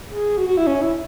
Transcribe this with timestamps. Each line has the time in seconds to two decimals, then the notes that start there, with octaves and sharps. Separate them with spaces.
0.09 G#4
0.38 F#4
0.48 F#4
0.57 E4
0.67 C#4
0.82 E4